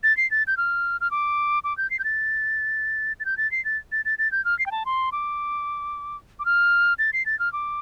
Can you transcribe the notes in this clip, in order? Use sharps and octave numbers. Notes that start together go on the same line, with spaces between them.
A6
C7
A6
G6
F6
F6
D6
D6
G6
C7
G6
A6
A6
G6
A6
C7
A6
A6
A6
A6
G6
F6
C7
G5
A5
C6
D6
D6
F6
A6
C7
A6
F6
D6